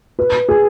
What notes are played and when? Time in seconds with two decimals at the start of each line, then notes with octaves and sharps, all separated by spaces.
0.19 B4
0.49 G#4